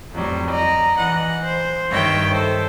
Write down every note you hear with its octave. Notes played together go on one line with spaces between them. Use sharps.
F2 A2 F#3 G3
D5 D#5 A#5
E3 D#5 F#5
C5
G2 D#3 C#5 E5 G5
A4 C5